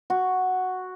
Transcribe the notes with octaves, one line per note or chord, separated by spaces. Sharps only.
F#4